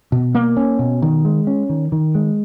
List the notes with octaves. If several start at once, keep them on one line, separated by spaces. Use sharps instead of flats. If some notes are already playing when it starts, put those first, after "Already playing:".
B2
A#3
C#4
B2
D#3
G#3
C#4
D#3
D#3
G#3